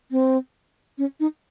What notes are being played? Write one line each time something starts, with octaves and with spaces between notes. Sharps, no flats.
C4
C#4
D#4